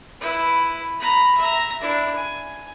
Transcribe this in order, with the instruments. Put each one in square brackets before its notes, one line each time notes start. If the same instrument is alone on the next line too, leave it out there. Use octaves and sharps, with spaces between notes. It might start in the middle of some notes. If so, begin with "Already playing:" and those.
[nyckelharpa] E4 B4
A#5 B5
E5 A#5
D4 E4
G#5